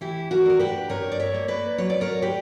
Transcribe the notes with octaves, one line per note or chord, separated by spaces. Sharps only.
E3 E4 G4
F#4 A#4
D4 A#4
G4 B4
G2 A#4 C#5
D5
C#5 E5
A#3
B4 D5
F#3 C#5
D5
A#4 C#5
D4 G4 B4